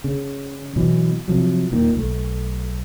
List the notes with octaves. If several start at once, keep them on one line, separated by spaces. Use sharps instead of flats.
C#3
B2 E3 F#3
C3 F3 F#3
D#1 A#2 D#3
B1 A3